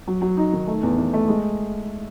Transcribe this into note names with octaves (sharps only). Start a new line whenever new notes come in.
F#3
F#3
D#4
D#3
A3
E2
E2
A3
G#3